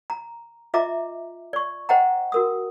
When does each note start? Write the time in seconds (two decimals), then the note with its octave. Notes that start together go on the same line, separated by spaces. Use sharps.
0.10 A#5
0.74 F4 D#5 E5 A#5 D6
1.53 D5 C#6
1.89 C5 D#5 F#5 G5 A#5
2.32 F#4 A#4 D#6